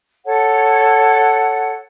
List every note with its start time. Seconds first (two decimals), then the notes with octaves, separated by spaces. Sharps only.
0.25 A4 C#5 F#5